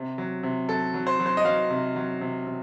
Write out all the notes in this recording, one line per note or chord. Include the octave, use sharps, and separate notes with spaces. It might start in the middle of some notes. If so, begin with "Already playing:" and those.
Already playing: C3
F#3
C3
F#3 A4
F#3
C5
F#3
C5
D#5
F#3 F5
C3
F#3
C3
C3